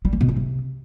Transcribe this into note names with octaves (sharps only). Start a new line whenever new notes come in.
G3
E3
B2
C4
C3